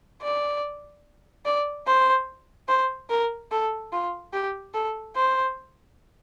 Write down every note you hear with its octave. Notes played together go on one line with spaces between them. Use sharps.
D5
D5
C5
C5
A#4
A4
F4
G4
A4
C5